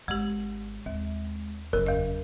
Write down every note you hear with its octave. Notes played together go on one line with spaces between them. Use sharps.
G#1 G#3 G4 E6
D#2 G#3
F#1 F#3 C#4 A#4
E2 D#5